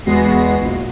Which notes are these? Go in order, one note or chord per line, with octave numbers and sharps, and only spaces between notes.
E2 G#3 B3 F#4 A#6 C7
A#1